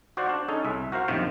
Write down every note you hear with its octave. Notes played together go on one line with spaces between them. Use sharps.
F#4 C5 D5 F5 F#5
D4
C#4 D#4 G#4 A4
C2 E5
F#4 A#4 C5 F5
A#1 F#2 C3 D#3 F4 C5